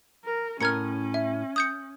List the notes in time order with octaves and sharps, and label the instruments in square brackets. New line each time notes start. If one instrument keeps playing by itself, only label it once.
[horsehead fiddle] A#4
[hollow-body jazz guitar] A2 A#4 [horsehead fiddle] C#4 [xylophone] F6 G#6 C#7
[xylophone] E5
D#6 G6 C#7